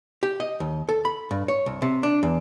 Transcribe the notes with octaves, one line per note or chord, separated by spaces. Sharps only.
G4
D#5
D#2
A4
B5
G2
C#5
C2
C3
D4
E2